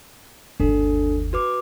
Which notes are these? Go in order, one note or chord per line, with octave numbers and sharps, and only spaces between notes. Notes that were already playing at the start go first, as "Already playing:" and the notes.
G1 D#2 D4 A4
F#4 B4 D6